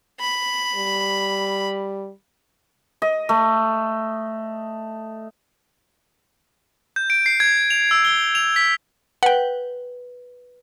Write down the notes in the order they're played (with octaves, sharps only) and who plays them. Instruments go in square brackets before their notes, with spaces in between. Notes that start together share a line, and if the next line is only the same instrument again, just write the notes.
[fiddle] B5
[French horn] G3
[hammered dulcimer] D#5
A3
[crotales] G6
D7
C7
G#6
F7
E6
G7
F7
B6
[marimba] B4 [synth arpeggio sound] F#5 G5